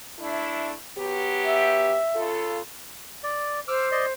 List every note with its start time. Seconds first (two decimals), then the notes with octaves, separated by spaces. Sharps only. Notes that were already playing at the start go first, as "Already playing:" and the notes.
0.19 A3 D4 E4
0.98 F#3 B3 G4
1.46 E5
2.16 C#3 F4 A4
3.24 D5
3.68 C5 D6 E6 F6
3.92 D5 D#5 C6